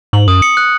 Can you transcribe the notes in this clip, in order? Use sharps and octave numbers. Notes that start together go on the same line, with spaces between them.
G#2 F#7
F#2 D#6
C#7
F#6